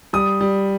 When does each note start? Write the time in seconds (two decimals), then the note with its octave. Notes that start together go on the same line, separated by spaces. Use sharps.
0.13 G3 D#6
0.41 G3